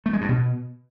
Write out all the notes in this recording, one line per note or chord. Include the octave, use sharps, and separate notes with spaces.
A3
G#3
G2
B2